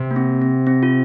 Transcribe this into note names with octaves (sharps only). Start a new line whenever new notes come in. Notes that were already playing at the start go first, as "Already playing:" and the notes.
Already playing: C3
A#3
C4
C4
C4
F4